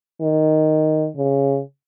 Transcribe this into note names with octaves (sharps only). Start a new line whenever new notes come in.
D#3
C#3